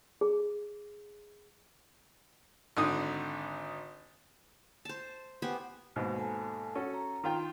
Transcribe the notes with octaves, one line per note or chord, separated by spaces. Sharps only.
G#4
G#1 D3 D#4 D#6
C5 A5
B3 G4 C5 G#5
D#2 G#2 B2
A4 G#5 A5
C#4 F#4 A4
A#5
D#3 F4 G5